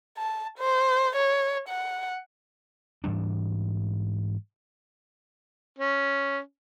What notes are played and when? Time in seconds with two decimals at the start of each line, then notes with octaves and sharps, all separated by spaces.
0.18 A5
0.59 C5
1.17 C#5
1.69 F#5
3.04 G#2 E3 G3 D4
5.79 C#4